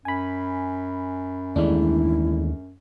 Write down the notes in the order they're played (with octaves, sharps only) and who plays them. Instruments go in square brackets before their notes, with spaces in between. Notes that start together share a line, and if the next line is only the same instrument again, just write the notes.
[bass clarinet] F#2 [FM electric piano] G#5 B5
[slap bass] D#2 E3 [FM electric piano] G#3 A3 D4 [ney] E4